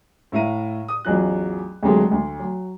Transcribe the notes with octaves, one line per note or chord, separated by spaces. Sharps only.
A2 E4 E5 F5 A#5 D#7
D#6
A1 E2 F#3 F4 F#6
D2 C3 D#3 F#3 G#3 A3
D2
F#3